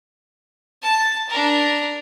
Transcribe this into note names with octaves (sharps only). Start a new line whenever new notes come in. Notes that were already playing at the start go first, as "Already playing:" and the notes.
A5
D4 A#4